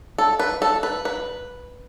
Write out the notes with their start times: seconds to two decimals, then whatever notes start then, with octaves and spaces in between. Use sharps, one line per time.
0.18 A4
0.39 B4
0.62 A4
0.83 B4
1.05 B4